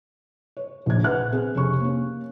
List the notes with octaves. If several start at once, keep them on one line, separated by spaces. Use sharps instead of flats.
C#5
A#1 G#6
B4 E5 F#5 F6 F#6
C4 G#4
F1 C#4 G4 C#6
A#3 C#4